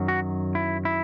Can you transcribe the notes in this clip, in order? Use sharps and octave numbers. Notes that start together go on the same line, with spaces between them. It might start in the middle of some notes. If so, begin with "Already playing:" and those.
Already playing: F#2 D#3 F#3
F#4
E4
E4